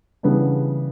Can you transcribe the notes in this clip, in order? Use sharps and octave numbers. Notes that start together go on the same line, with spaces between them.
C#3 E3 G3 B3 D4